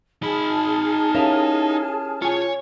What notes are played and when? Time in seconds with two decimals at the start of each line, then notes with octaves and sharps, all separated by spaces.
0.23 D#4 G#4 A5 B5 F6
1.15 C#4 E4 G4 A#4 E5 F5
2.22 F4 C#5 G#5